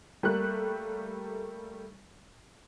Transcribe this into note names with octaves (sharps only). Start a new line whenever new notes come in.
G3 A3 A#3 F#6